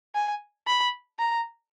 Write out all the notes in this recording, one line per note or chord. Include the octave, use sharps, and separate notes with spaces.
G#5
B5
A#5